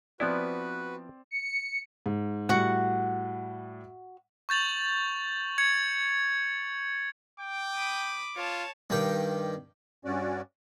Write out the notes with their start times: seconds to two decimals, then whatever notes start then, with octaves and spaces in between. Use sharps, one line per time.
0.20 F3 B3 C4 E4 F#4 B4 D5
1.31 C#7
2.06 G#2
2.49 A2 G3 F#4 F#5
4.49 C#6 G6 A6 F7 F#7
5.58 G#6 C#7
7.40 G5 D6
7.75 B5 D#6
8.36 F4 C#5 A5
8.90 G2 D#3 G5
10.05 G2 C#4 F#4 D5